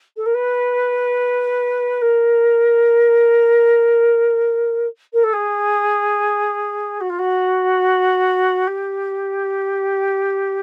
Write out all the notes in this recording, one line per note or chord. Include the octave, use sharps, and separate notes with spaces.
A4
A#4
B4
A#4
A#4
A4
G#4
F#4
F4
F#4
G4